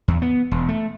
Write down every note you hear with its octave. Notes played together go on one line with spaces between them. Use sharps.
E2
B3
E1
A3